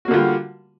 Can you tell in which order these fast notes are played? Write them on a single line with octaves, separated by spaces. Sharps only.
F#4 A#3 D3 F4 G3